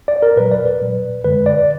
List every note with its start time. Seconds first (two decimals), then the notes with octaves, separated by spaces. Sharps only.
0.08 D5
0.22 A#4
0.36 A#2 F#3 B4
0.51 D5
0.66 B4
0.81 A#2 F#3
1.24 F#2 D3 G#3 B4
1.46 D5